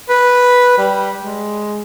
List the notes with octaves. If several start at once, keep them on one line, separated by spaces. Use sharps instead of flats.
B4
G3
G#3